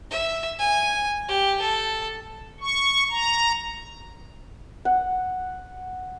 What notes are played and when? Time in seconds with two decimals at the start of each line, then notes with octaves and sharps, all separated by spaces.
0.10 E5
0.59 G#5
1.28 G4
1.61 A4
2.61 C#6
3.11 A#5
4.85 F#5